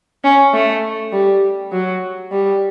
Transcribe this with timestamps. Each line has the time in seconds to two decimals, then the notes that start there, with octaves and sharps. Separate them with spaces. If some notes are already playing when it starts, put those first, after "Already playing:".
0.24 C#4
0.54 A3
1.12 G3
1.72 F#3
2.31 G3